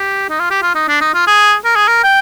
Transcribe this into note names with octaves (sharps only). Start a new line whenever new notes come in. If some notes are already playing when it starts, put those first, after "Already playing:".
Already playing: G4
D#4
F4
G4
F4
D#4
D4
D#4
F4
G#4
A#4
G#4
A#4
G5